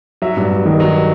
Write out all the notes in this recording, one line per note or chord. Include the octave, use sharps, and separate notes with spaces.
F#3 E5
G2
G2
D#3
F#3